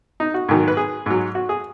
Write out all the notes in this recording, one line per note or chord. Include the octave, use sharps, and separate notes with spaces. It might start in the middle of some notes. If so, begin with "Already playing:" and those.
D#4
F#4
G#2 D#3 F#3
B4
G#4
G#2 F#3
F#4
G#4